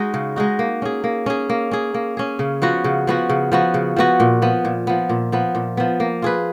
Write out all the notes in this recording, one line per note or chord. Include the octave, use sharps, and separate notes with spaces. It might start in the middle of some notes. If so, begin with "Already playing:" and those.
Already playing: G#3 D#4 F#4
C#3
G#3 D#4 F#4
A#3
C#4 G#4
A#3
C#4 G#4
A#3
C#4 G#4
A#3
C#4 G#4
C#3
F3 B3 F#4
C#3
F3 B3 F#4
C#3
F3 B3 F#4
C#3
F3 B3 F#4
A#2
F3 B3
A#2
F3 B3
A#2
F3 B3
A#2
F3 B3
A#3
F4 G#4 B4